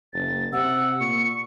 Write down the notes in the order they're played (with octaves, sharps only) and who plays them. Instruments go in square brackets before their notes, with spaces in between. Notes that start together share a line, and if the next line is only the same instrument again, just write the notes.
[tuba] F#1 [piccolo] A6
[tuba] C3 [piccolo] F#5 [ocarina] E6
[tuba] A#2 [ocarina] C#6 [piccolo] C#7